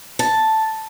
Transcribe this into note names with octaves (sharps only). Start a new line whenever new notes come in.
A5